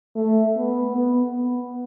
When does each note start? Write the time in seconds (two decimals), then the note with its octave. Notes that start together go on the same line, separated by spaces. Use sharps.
0.16 A3
0.57 B3
0.96 B3
1.30 B3